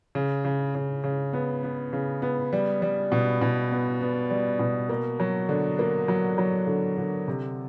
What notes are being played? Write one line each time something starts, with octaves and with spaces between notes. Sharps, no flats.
C#3
C#3
C#3
C#3
B3
B3
C#3
B3
G3
G3
B2
B2
B3
B3
G3
B2
A#3
F#3
D3
A#3
F#3
F#3
D3
D3
C3